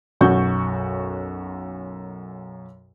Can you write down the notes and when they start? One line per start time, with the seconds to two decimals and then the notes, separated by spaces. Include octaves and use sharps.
0.21 B1 F#2 F#4 C#6 G6